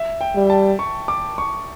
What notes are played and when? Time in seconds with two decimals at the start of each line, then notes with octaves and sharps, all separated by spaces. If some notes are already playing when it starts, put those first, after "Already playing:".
Already playing: E5
0.21 G5
0.35 G3
0.50 A5
0.79 C#6
1.08 D6
1.38 C#6